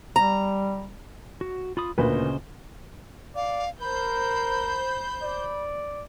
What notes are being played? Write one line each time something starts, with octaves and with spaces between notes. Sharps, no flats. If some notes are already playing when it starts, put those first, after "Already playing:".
G3 A#5
F#4
F4 B5 D#6
D2 A#2 C#3 B4 C5 D#5
D5 F5
A#4 C5 B5 G6
D5